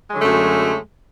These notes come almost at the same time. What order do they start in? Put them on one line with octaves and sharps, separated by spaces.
G#3 F#3 D3 A3 F#2